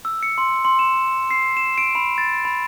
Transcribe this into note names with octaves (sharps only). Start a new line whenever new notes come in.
E6
C#7
C6
C6
E7
C7
E7
D7
B5
A6
B5